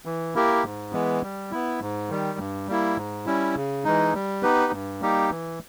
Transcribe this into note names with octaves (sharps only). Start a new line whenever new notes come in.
E3
A#3 E4 G4 A#4
G#2
E3 G#3 B3
G3
B3 E4
G#2
D#3 G3
G2
G3 A#3 E4
G#2
G3 C#4 E4
C#3
E3 G#3 D#4
G3
B3 D#4 G4 B4
G2
G3 A#3 D#4 G4
E3